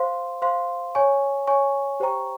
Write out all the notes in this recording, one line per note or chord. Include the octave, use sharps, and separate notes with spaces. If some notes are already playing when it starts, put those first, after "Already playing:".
Already playing: C5 F5 C6
C5 F5 C6
C#5 G#5 C#6
C#5 G#5 C#6
G4 C5 G5 A#5 C#6